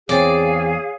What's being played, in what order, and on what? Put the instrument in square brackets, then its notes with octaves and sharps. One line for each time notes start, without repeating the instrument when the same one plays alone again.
[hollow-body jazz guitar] E2 C4 [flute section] G#4 F5 [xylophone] C#5 [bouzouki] D5